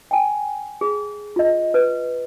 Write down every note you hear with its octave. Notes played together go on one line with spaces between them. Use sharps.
G5 G#5
G#4
F4 D#5
B4